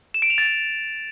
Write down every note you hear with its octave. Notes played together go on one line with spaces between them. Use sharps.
E7
D7
F7
A6